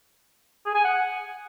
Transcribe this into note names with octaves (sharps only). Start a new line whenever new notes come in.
G#4
G#5
F#5